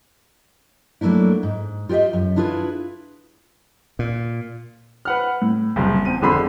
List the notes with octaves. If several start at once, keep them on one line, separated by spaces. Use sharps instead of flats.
F#3 A3 A#3 D4 E4
G#2
F4 G4 C5 D#5 E5
F#2
D4 E4 F4 G#4 B4
A#2
B4 F#5 F6
A2
F#1 C2 A#2
E2 C4 D#7
G#1 F2 D3 G#4 B5 C6